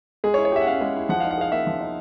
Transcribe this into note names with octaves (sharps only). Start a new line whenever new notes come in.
G#3 G#4
C#5
E4
C#5
G4 E5
F#5
C#4 F5
G#3
E4
F3 F#5
D#4 F5
F#5
G#4 F5
A#3 E5
F3
D#4